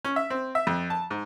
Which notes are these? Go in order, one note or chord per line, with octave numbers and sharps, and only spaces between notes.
C#4
E5
C4
E5
F2
A5
G#2